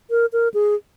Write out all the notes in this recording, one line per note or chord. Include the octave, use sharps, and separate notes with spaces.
A#4
A#4
G#4